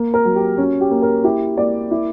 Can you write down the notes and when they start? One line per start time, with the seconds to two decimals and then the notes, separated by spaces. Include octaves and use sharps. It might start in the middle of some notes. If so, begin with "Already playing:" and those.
Already playing: A#3
0.14 A#4
0.25 F#3
0.36 G4
0.58 C#4 F#4
0.81 G4
0.91 A#3
1.02 A#4
1.24 E4 G4
1.58 A#3 D5
1.91 E4